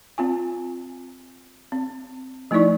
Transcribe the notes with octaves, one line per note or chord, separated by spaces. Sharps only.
C4 F4 G#5
C4
F3 A3 D#4 E4 D5 C#6